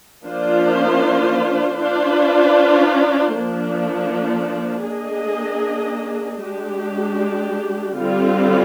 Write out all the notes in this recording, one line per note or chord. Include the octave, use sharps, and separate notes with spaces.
F3 A#3 D4 F4 C5
D4 F4 C5
F3 A#3 D4
A#3 D4 G#4 D#5
G#3 D4 G4
D3 G3 C4 F4